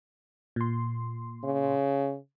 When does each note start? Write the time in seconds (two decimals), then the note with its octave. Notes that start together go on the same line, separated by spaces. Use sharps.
0.56 A#2 C6
1.44 C#3